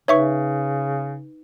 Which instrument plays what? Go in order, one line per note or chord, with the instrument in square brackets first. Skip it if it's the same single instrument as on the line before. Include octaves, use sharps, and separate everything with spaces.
[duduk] C#3 [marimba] D#4 B4 [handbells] C#5 E5 C#6